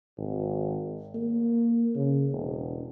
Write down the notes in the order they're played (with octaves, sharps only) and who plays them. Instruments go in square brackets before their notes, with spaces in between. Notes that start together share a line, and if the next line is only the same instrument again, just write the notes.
[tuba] G#1
A#3
C#3
E1